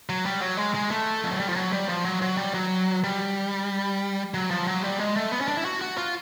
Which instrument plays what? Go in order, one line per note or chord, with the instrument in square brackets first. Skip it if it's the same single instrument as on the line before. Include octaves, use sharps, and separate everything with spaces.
[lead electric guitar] F#3
G3
F#3
G#3
G#3
A3
F3
F#3
G3
F3
F#3
G3
F3
F#3
F#3
G3
F#3
G3
F#3
F3
F#3
G3
G#3
A3
B3
C#4
D4
E4
F#4
F#4
F4